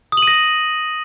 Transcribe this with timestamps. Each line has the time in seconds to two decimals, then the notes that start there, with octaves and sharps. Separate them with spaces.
0.12 D#6
0.17 F#7
0.22 D#7
0.27 A#6